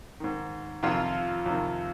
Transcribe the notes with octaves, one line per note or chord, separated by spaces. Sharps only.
G#2 D#3
F2 C3 D#3 F4
F2 C3 D#3